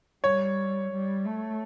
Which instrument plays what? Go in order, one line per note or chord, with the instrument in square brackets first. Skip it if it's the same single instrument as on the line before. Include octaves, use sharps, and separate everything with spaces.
[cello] G3 [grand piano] C#5
[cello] G3
A3